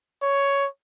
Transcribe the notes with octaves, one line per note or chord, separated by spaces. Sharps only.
C#5